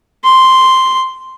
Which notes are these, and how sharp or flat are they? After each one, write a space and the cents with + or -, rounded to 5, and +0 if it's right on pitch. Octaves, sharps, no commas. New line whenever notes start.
C6 +0